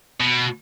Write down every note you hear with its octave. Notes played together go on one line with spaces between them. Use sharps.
B2